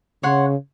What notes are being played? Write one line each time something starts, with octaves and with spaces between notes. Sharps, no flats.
C#3 C#5 F#5 C6